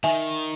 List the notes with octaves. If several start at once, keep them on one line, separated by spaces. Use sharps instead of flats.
D#3 E5 G#5